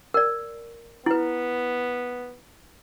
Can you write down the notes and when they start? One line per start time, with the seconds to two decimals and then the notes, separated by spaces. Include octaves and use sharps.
0.14 A#4 D5
1.06 B3 E4 B4